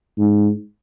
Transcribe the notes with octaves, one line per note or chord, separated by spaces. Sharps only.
G#2